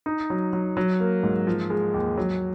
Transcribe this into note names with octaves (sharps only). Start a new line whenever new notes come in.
D#4
F#3
F#3
F#3
A#3
G#2
F3
G#3
D#2
F#3